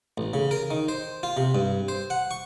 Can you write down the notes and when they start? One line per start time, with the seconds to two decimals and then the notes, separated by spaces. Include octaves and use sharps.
0.18 A1
0.34 C#3
0.51 A#4
0.71 D#3
0.88 C5
1.23 F4
1.37 C3
1.55 G2
1.88 C5
2.10 F#5
2.31 C#6